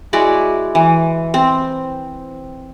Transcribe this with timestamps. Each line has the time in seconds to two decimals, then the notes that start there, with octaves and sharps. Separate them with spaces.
0.13 G#3 E4 F#4 D5
0.75 E3
1.34 C4